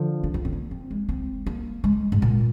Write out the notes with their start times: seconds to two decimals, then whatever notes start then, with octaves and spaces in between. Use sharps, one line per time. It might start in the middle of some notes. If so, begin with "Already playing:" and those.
Already playing: D3 F3
0.24 D4
0.34 C4
0.45 C4
0.53 A#3
0.71 C4
0.91 G#3
1.09 C4
1.46 A#3
1.84 G#3
2.12 G#2
2.22 A#2